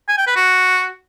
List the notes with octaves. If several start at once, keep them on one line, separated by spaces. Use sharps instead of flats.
G#5
G5
B4
F#4